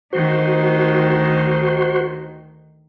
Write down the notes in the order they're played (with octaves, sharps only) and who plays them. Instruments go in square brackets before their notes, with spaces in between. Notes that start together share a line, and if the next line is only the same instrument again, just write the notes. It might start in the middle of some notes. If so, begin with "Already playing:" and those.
[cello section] D2 D#3 [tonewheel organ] F#4 C5